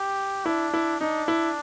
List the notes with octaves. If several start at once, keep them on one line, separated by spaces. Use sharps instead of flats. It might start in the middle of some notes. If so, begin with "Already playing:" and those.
Already playing: G4
D4 E4
E4
D4 D#4
E4